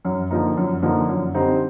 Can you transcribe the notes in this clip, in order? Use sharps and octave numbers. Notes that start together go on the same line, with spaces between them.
F#2
D3 F3 A#3 D#4
F#2
D3 F3 A#3 D#4
F#2
D3 G3 C4 D#4